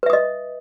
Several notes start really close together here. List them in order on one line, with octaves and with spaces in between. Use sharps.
B4 E5 D#6 D#5